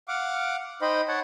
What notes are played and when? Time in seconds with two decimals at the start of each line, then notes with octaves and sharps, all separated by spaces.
0.08 F5 F#5 D6
0.82 D#4 C5 D#5 G5 B5
1.08 C#5 F#5 A5